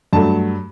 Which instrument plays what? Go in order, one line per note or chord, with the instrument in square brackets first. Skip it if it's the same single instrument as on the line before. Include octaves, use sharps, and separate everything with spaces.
[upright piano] G2 F#3 A3 A5